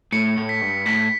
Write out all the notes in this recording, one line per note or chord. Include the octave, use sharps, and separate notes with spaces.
A2 C#7
A2
B6
G2
A2 B6